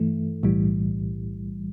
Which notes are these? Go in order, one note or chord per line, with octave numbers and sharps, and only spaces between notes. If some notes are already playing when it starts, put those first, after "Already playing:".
Already playing: G2 E3 A3
B1 A2 E3 G3